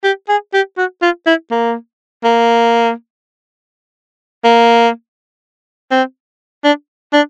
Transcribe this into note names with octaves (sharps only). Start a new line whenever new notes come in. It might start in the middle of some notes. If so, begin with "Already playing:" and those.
G4
G#4
G4
F#4
F4
E4
A#3
A#3
A#3
C4
D4
D4